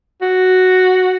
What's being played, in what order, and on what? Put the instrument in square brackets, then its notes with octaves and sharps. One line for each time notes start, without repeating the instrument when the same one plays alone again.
[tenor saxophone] F#4